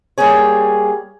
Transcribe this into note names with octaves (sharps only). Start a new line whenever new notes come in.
G3 A#3 G4 G#4 C#5